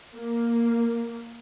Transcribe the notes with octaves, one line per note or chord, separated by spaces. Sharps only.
A#3